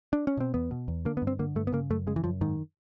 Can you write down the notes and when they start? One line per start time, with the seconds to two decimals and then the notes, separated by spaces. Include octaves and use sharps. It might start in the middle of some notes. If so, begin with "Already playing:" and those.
0.13 D4
0.27 C#4
0.37 B2 C4
0.54 E2 B3
0.71 B2
0.88 E2
1.05 D3 A#3
1.17 B3
1.22 G2
1.27 C4
1.39 D3 A#3
1.56 G2 A3
1.67 B3
1.73 C#3 A#3
1.90 F#2 A3
2.07 C#3 G#3
2.16 E3
2.24 F#2 F3
2.41 G#2 D#3